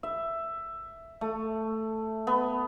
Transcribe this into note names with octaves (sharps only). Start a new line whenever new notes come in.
E5
A3
B3